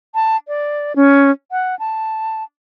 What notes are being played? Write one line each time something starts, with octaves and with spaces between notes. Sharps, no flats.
A5
D5
C#4
F#5
A5